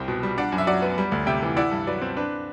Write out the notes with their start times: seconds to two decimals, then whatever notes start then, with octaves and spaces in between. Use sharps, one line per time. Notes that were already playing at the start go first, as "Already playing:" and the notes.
Already playing: C2 G3 C4 G5
0.08 B2
0.23 G3
0.38 D4 D5 F#5
0.52 F#2
0.58 E5
0.67 F#3 D5 F#5
0.82 B3
0.98 G3
1.12 D2
1.27 C3 E5 G5
1.43 E3
1.57 E4 D5 F#5
1.71 G2
1.87 F#3 B4 D5
2.02 C4
2.17 D4 B4